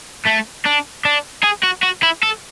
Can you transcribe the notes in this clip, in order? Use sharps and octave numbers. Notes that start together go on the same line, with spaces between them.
A3
D4
D4
G#4
F#4
F#4
E4
A4